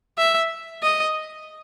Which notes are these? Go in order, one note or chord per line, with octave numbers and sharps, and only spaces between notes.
E5
D#5